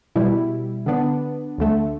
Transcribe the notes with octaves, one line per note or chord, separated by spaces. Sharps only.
B2 G3 E4
D3 B3 D4
D2 D3 A3